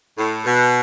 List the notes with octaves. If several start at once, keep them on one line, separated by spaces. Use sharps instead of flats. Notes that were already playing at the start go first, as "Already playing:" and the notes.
A2
B2